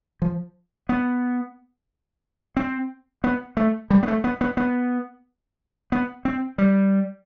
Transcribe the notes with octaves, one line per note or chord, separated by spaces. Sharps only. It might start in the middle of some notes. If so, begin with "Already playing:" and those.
F3
B3
C4
B3
A3
G3
B3
A3
B3
B3
B3
B3
C4
G3